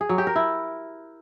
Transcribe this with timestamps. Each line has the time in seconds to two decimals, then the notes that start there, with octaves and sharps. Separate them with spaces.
0.01 G#4
0.09 F#3
0.18 G4
0.27 A#4
0.36 E4